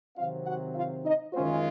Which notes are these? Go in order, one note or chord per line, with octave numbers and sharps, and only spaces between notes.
C3 D#3 F#3 C4 F4 F5
F#4 F#5
F4 F5
D#4 D#5
F#2 D#3 G#3 C4 C#4 F4 C5